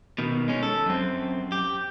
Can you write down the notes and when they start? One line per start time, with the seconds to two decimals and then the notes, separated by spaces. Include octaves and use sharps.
0.18 B2 D#3
0.48 G#3 C#4
0.63 A4
0.86 F#2 C4
1.52 G4